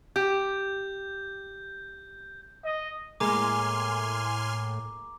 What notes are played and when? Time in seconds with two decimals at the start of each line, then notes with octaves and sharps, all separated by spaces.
0.16 G4 G6
2.64 D#5
3.20 A2 G#3 A#3 G#5 A#5 C6 D6 F6